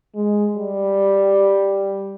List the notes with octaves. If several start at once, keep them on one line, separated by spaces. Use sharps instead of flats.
G#3
G3